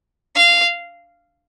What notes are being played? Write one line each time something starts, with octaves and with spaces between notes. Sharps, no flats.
F5